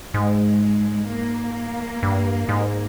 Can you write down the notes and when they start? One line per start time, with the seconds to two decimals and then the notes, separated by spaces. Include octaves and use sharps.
0.14 G#2 G#3
1.08 A#3
2.03 G2
2.49 G#2